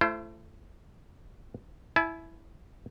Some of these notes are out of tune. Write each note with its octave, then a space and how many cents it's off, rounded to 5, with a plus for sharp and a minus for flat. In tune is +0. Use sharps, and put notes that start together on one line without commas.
A3 +0 E4 +40 C5 +0
E4 +0 G#5 +45